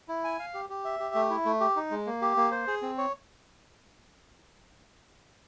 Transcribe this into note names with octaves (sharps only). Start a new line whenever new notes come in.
E4
G#5
F5
G4
G4
E5
G4
A3
E4
A3
G4
D#4
G#3
A#3
G4
A#3
C5
G#4
C4
C#5